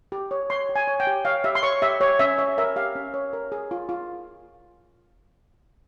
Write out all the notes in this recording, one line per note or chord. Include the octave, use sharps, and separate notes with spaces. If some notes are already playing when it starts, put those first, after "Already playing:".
G4
C#5
C#5 C6
G4
G#5
C#5
G5
G4
C#5 F5
G4 E5
C6
C#5 C#6
G4 E5
G4 C#5
C#4 E5
C#5 E5
A#4 E5
G4 F5
C#4
C#5
A#4
G#4
F4
F4